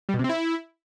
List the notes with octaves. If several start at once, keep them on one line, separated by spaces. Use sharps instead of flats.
G3
B2
C3
C4
E4